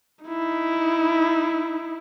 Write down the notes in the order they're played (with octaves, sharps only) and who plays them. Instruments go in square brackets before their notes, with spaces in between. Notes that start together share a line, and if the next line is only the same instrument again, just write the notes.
[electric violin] D#4 E4